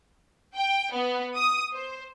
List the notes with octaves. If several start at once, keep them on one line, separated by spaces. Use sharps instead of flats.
G5
B3
D#6
C5